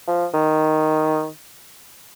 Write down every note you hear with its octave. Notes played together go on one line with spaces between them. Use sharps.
F3
D#3